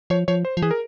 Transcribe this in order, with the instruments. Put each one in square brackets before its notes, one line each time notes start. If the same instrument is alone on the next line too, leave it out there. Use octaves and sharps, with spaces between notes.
[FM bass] F3 [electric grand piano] C#5
[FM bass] F3 [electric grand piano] C#5
[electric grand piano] C5
[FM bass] F3
[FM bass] E3 [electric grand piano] G#4
[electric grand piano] A#4